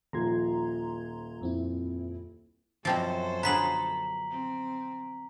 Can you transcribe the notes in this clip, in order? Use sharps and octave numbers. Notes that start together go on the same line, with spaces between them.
D#1 F3 A#5 C6 G#6
F2 C4 E4
F#2 B2 F3 C4 A4 C5 D5
D3 F#3 B3 G#4 B4 A#5 B6 F#7
C4